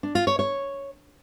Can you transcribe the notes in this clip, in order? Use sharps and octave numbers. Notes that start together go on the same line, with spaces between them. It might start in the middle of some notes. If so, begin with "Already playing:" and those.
D4
F4
C#5
C#5